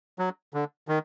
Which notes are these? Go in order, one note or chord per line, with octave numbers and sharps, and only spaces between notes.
F#3
D3
D#3